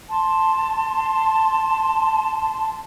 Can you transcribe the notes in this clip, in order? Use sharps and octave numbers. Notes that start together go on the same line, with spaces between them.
A5 C6